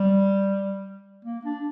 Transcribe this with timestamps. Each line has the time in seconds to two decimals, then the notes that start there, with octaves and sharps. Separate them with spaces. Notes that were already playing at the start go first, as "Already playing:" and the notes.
Already playing: G3
1.25 A#3
1.45 D4